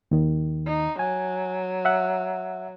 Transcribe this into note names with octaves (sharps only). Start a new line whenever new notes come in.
D#2 D#3
D#4
F#3 G#5
E5 F#5